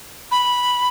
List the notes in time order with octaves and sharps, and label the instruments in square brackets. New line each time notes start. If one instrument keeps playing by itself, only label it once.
[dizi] B5